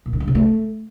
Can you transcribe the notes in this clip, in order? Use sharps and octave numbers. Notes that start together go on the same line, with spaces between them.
A#2
D#3
G2
C3
A3